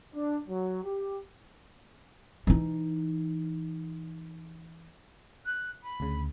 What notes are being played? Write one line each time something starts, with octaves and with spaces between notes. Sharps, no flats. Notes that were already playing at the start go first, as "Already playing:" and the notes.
D4
F#3
G4
E3 D#4
F#6
B5
D2 C#3